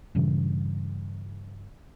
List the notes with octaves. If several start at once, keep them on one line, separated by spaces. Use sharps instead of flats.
G2 A#2 C#3 E3